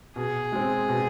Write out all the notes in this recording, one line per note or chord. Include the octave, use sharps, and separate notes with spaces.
B2 G#4
G#3 C4
B2